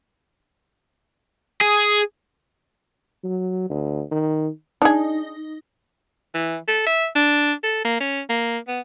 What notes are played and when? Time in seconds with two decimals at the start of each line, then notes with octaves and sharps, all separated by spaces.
1.61 G#4
3.24 F#3
3.70 D2
4.11 D#3
4.82 D4 D#4 G#4
6.34 E3
6.68 A4
6.87 E5
7.16 D4
7.64 A4
7.85 A#3
8.00 C#4
8.30 A#3
8.68 B3